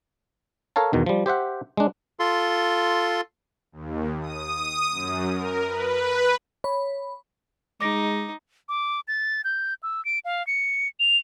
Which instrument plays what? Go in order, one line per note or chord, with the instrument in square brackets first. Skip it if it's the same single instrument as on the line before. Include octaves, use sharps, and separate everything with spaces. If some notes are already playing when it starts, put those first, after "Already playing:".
[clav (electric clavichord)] A4 A#4 C#5 F5 A5
E2 B2 D#3
F3 G3
G4 C5 E5 F#5
G#3 D4
[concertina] F4 A4 C6
[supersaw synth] D#2
D#6
F#2
A#4
B4
[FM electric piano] C#5 B5
[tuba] G#3 [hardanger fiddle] D#4 [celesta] D6 A#6 D7
[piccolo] D6
A6
G6
E6
D7
F5
C#7
F7